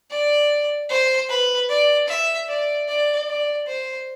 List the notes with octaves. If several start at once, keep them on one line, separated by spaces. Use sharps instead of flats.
D5
C5
B4
D5
E5
D5
D5
D5
C5